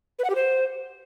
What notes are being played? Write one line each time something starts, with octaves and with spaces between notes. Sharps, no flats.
B4
F#5
G4
C5